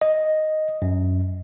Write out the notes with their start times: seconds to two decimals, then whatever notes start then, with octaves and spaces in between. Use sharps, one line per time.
0.01 D#5
0.82 F#2